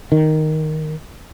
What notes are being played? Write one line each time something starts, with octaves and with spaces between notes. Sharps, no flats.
D#3